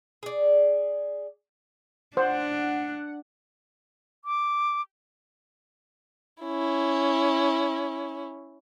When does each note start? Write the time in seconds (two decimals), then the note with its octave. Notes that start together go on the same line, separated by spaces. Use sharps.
0.23 G#4 D5
2.17 D4 C5 F#5
4.25 D6
6.44 C#4 E4